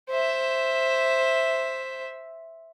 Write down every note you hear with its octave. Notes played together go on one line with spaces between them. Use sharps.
C5 E5